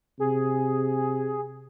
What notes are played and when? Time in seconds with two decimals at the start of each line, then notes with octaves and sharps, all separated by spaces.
0.20 C3 G#4